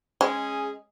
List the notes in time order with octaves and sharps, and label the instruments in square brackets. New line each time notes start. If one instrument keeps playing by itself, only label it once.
[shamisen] G#3 [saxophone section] C#4 G#4 D#5